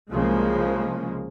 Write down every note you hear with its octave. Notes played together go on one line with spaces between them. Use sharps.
C2 C#3 F3 G#3 A#3